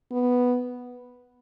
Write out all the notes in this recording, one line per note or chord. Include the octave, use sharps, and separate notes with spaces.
B3